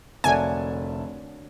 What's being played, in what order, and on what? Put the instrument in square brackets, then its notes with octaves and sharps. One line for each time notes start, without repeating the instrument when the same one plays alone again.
[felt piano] F1 E5 A5 [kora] D3 F#3 A#3 [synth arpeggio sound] G#5